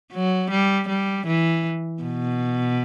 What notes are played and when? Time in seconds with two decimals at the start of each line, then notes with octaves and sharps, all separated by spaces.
0.13 F#3
0.51 G3
0.89 G3
1.27 E3
2.03 B2